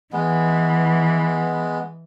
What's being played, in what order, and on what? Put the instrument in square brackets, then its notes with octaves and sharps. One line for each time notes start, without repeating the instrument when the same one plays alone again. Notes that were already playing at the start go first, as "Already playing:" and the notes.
[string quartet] E3 [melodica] G#3 B3